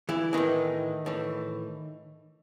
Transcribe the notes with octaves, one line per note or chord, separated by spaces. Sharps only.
E3 E4
A2 D#3 E3 D#4
A2 E3